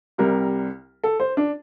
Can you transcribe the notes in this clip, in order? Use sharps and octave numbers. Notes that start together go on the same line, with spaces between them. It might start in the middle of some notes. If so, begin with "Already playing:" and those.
C2 C3 G3 A#4
A4
C5
D4